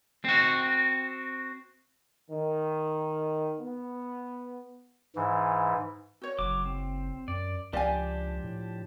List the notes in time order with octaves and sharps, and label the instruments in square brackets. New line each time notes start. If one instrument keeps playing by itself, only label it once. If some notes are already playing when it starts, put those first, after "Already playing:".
[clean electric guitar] C4 F#4
[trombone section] D#3
B3
[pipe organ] G#2 E3
[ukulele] F#4 C#5
[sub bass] F#1 [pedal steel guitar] F#3 D6
[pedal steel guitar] C4
[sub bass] F#2 [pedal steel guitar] D5
[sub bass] C#2 [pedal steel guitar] F3 D4 G4 [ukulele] D5 F5 G#5
[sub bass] A2